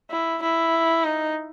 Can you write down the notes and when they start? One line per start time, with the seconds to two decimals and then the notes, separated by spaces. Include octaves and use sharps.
0.10 E4
0.42 E4
1.04 D#4